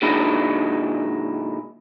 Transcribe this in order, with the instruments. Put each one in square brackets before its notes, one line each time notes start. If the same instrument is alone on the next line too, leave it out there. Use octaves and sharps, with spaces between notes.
[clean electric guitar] A#2 D3 F#3 G#3 D#4 E4